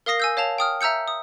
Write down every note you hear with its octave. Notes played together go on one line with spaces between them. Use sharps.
A#4 F5 D#6 A#6 C7
G#5 E6 G6
C#5 F5 A5 F7
G5 D#6 F6
E5 A#5 E6 G6 C#7
D#6